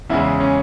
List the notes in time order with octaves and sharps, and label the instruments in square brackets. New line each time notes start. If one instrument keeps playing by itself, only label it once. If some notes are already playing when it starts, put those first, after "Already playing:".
[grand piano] E2 C#3 E3 G#3 E4
C#4